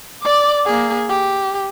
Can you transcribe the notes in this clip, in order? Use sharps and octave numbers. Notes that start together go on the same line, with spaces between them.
D5 D6
A#3 G#4
G4